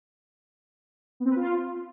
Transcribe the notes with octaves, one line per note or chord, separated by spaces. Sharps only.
B3
C4
B4
F4